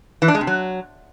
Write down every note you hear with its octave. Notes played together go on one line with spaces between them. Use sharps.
E3
D4
G#3
C3
F#3